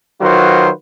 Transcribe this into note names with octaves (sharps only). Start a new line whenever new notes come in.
D#3 F#3 F4 F#4 B4 C5